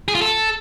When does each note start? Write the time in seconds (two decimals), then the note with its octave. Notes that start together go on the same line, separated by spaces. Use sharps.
0.08 G#4
0.15 F4
0.22 A4